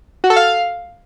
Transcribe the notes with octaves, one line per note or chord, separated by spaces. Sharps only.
F#4
A4
F5